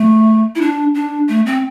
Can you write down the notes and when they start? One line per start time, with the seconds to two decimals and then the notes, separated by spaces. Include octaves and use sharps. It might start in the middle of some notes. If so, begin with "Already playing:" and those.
Already playing: A3
0.56 E4
0.61 D4
0.95 D4
1.29 A3
1.46 C4